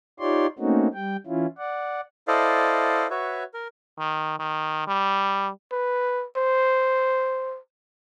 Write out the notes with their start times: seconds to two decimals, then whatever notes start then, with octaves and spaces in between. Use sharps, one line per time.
0.20 D#4 F4 G4 C#5 D5 C6
0.59 A3 A#3 C4 C#4 D#4 F#4
0.94 G3 G5
1.27 E3 C#4 E4 F4
1.58 D5 F#5
2.28 E4 A4 C5 D5 D#5 F5
3.10 F#4 B4 C#5 E5
3.54 A#4
3.99 D#3
4.39 D#3
4.87 G3
5.72 B4
6.37 C5